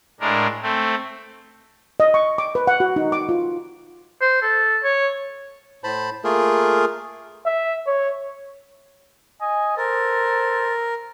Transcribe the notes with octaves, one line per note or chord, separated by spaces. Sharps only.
A2 G#3 D4 A#4
A3 C4
D#5
C#6
D6
B4
F#5
F#4
D#4
D6
F4
C5
A4
C#5
A2 C5 A5 B5
A3 A#3 F4 G#4 A#4
E5
C#5
D#5 G#5
A4 A#4 C5